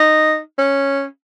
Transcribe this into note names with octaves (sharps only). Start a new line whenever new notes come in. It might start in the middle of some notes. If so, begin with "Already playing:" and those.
Already playing: D#4
C#4